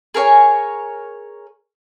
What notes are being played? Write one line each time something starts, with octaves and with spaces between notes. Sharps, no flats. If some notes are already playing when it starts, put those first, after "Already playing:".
G#4 A#4 C#5 G#5